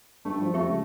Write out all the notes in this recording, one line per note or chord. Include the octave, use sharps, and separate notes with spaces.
G2 A3
F3
F2 G4 E5 C#6
C#2